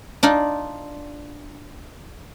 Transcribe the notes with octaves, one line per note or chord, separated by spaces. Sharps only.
D4 D#4 F4